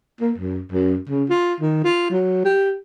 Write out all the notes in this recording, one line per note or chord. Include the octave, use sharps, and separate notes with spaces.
A#3
F#2
F#2
C#3
F4
D#3
F4
F#3
G4